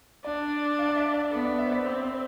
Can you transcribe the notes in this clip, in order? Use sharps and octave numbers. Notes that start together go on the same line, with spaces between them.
D4 D5
F5
D5
E5
D5
B3 A4
D5
E5
C5
D5
C4 C5
C5